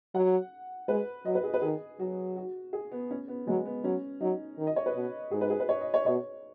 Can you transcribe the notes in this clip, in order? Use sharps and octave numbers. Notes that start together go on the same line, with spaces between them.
F#3 F#5
G#3 B4
F#3 D#5
B4
G#4
B4
D#3 G#4
F#3 F#4
F#4
G#4
B3
C#4
B3
F#3 G#3
B3
F#3 C#4
F#3 D#4
D#3
D#5
C#5
B4
B2
G#2 G#4
B4
G#4
B4
C#5
D#5
C#5
B2 C#5